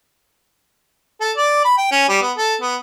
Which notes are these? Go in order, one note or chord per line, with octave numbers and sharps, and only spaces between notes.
A4
D5
B5
G5
C#4
G3
B3
A4
B3